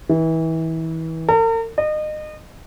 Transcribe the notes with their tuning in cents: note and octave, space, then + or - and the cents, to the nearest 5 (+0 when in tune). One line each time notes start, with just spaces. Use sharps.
E3 -30
A#4 -45
D#5 -30